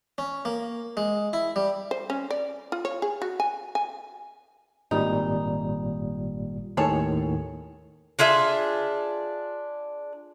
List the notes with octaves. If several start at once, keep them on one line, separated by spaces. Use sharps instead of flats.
C#4
A#3
G#3
E4
G3
C5
C#4
D5
F4
C#5
G#4
F#4
G#5
G#5
G#1 A#2 G3 D#4
D#2 A2 D#3 G#4 A4 C#5
D4 F4 G#4 E5